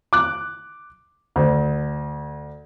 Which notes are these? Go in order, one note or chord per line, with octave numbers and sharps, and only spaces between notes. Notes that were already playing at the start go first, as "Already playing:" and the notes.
D6 F#6
D2